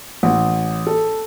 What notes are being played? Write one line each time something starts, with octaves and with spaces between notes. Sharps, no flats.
A1
A4